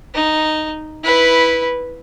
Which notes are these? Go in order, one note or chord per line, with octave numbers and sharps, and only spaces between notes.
D#4
E4 B4